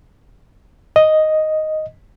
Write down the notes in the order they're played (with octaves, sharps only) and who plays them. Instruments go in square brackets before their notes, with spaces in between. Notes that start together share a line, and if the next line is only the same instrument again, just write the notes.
[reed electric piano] D#5